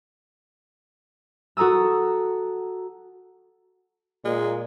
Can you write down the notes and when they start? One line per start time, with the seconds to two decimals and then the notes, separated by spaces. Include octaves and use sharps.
1.57 F#4 A4 A#5 D#6 E6
4.25 A#2 G#3